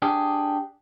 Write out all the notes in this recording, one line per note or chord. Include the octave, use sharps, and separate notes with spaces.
D4 G4 G#4